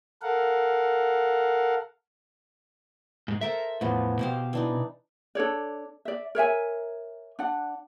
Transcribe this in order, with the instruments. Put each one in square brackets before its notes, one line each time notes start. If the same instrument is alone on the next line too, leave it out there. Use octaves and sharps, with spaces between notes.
[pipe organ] A4 A#4 F5 F#5
[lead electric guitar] G#2 G#3
[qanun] A4 A#4 C5 [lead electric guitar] E5
[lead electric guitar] E2 A2 [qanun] F3 B3
[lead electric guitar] B2 [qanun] G4 C5 F5
[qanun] E3 D4 D#4
[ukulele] D4 A4 C#5 D5
D5 E5
A#4 C#5 E5 G#5
D4 D5 F#5